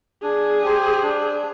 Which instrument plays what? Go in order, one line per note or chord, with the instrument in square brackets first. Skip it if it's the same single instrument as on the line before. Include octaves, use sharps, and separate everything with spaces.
[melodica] D4 [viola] G#4
[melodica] G4 C5
D4